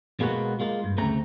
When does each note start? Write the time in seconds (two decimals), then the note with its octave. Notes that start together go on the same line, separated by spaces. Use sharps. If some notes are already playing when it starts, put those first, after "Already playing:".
0.20 B2 G#3 A#3 B3 F#4
0.60 G#3 A#3 F4
0.84 G2
0.97 D2 C#3 A3 C4 A#5